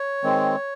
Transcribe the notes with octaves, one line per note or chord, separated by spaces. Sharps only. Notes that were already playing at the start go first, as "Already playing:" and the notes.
Already playing: C#5
D#3 G#3 C4